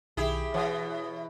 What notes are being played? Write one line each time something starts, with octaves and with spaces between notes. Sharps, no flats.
B1 D#3 E4 G4 G#4
B2 E3 C#5 F#5 D#6